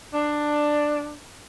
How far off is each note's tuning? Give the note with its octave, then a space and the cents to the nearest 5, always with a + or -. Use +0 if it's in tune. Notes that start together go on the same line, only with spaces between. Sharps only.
D4 +10